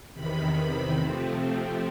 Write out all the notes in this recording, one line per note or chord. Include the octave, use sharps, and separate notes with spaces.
E2 C3 D#3 B5
C3 F3 A3 C4